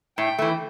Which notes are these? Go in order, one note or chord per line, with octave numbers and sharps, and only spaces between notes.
A2 G5
E3 A3